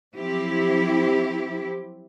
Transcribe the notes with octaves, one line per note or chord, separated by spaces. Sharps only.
F3 F#3 C4 E4 G4